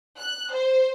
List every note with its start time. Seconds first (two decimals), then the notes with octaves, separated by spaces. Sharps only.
0.19 F#6
0.53 C5